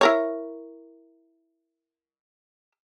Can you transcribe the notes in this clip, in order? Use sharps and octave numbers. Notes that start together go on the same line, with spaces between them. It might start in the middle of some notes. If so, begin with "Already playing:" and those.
E4 A#4 C#5